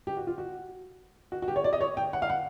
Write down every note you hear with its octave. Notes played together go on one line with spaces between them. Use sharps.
G4
F#4
F4
F#4
F#4
F#4
G4
C#5
D5
D#5
C#5
G5
F#5
F5
F#5